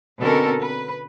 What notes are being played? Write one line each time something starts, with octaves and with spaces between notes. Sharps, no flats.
B2 D3 C4 C#4 A4 A#4
B4